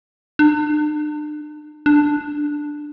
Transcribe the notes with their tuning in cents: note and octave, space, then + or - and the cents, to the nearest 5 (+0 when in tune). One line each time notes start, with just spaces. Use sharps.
D4 +40
D4 +5